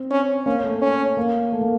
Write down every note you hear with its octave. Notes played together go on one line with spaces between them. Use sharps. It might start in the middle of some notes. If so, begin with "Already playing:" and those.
Already playing: C4
C#4
A#3 C#4
A3
C#4
A#3
A3
A#3